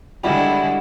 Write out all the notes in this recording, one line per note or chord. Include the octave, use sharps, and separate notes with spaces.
D3 G3 G#3 E4 F#4